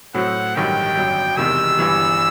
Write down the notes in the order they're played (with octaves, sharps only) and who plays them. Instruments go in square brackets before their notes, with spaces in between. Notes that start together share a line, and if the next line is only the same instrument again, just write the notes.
[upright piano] A2 F#3 C4 [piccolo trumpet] F#5
[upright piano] A1 G2 D#3 F#3 [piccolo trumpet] G5
[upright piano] G1 F#2 F#3
[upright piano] E1 E2 C3 D#3 [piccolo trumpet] E6
[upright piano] G1 G2 E3